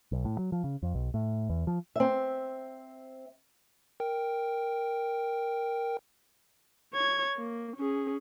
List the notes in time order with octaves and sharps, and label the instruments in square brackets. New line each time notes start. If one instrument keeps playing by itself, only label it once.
[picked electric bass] B1
A2
F#3
F3
C#3
F2
B1
A2
E2
F3
[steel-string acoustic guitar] C4 E5
[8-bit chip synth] A#4 G5
[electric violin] C#5 G#6
A#3
C#4 G#4